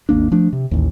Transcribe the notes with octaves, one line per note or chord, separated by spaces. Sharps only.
G#1 D#2 A#3 D4
F3 A3 D4
C3
A1 D#2